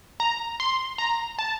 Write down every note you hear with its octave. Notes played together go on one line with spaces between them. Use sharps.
A#5
C6
A#5
A5